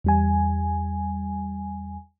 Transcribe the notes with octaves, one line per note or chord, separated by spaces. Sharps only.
E2 G3 G#5